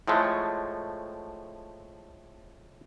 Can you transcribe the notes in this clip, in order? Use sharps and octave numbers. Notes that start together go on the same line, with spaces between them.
A2 F3 G#3 A3